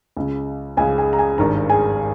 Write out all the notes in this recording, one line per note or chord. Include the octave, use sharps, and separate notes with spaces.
C#2 C#3
C#2 C#3 G#4 G#5
G#4 G#5
A#5
G#4 G#5
G#1 G2 D#3 A#4 A#5
G#4 G#5